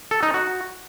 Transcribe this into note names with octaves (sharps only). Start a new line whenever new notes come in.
A4
D#4
F#4